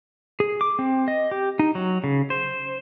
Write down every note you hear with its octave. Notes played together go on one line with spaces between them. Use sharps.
G#4
D6
C4
D#5
G4
D#4
F#3
C#3
C5